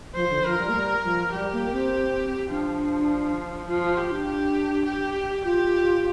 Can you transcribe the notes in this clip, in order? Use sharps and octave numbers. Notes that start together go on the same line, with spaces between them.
F3 C5
D3
F3 A#4
G3
A#3
G3
F3
G3 G4
A#3
C4
F3 D4
F3 F4
F4
F4 G4
D4
G4
G4
F4 G4